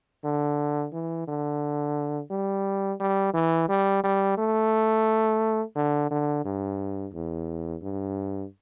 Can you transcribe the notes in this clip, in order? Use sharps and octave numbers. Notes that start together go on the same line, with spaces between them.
D3
E3
D3
G3
G3
E3
G3
G3
A3
D3
D3
G2
E2
G2